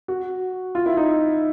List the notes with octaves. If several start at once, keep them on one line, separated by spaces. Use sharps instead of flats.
F#4
F4
E4
D#4